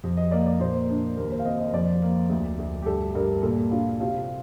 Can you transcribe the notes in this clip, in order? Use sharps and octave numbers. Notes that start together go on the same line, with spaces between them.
F2
D#5
A#3 D5
D5
A#2 C5
D4
D#2 A#4
C5
F5
C4 D#5
D#5
F2 D5
A#3
D2
D2
G4
G2 A4
G2 A#4
A#2 A4
D4 F4
C3 F4